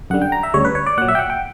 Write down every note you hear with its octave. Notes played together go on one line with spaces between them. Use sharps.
F#2 D3 G3 F#5
G5
A#5
E5
D2 C#3 G3 C#5
B4
C#5
D5
A#2 F#3 F#5
E5
G5
F#5
G5